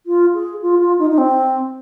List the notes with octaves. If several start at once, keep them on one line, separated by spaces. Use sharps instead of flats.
F4
G#4
F4
F4
D#4
D#4
C4